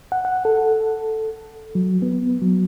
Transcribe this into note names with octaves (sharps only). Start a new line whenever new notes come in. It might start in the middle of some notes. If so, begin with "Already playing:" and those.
F#5
F#5
A4
F#3
B3
F#3